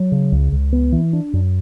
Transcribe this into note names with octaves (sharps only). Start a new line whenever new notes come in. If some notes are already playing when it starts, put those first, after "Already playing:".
Already playing: F#3
C#3
C#2
C#2
B3
E3
D4
F#2